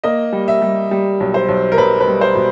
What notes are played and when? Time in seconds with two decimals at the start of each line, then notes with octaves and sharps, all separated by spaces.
0.04 A#3 D#5
0.33 G3
0.48 E5
0.62 G3
0.91 G3
1.20 B1
1.34 C5
1.49 B1
1.72 A#4
1.78 B1 B4
2.00 B4
2.08 G3
2.21 C5
2.35 B2